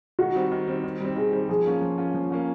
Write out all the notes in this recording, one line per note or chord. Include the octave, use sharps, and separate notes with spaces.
D#3 F#4
G3 C4
D#3
G3 C4
D#3
G3 C4
D#3 G#4
G3 C4
F3 G#4
A#3 C#4 F4
F3
A#3 C#4 F4
F3
A#3 C#4 F4